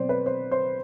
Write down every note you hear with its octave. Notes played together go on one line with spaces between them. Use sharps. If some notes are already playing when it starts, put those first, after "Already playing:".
Already playing: B2 F#3 C4 C5 D5
B4
C5
C5